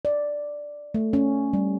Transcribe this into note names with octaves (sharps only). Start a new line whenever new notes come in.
D5
A3
C#4
G3